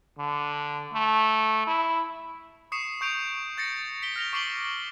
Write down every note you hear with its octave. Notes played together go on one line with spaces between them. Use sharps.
D3
A3
E4
C#6 D#6 C7 C#7 E7
C#6 G6 D7 F7
G6 A6 A#6 C#7
B6 D7 G7
F6 A#6 F7 G7
C#6 D6 C7 D7 F#7 G7